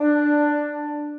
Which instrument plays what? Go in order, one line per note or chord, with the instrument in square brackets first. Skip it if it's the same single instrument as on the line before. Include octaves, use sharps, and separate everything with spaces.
[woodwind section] D4